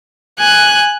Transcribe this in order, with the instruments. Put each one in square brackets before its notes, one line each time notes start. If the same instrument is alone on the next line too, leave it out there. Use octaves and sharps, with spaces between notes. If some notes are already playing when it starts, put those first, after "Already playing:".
[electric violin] G#5 [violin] F#6